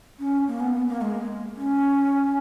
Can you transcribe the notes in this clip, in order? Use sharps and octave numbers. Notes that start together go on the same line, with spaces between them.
C#4
A#3
B3
B3
A#3
G#3
C#4